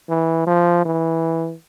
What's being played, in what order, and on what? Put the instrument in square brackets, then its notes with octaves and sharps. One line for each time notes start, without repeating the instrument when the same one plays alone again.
[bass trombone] E3
F3
E3